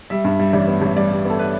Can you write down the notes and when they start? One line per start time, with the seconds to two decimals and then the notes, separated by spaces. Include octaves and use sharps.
0.10 G3 E5
0.24 G2
0.39 G3
0.53 A1 D5
0.67 B3
0.82 A1
0.96 G3 D5
1.11 G3
1.25 B3 A4
1.39 B4